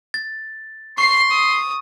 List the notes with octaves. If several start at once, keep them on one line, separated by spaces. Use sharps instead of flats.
A6
C6 C#6 C7
D#6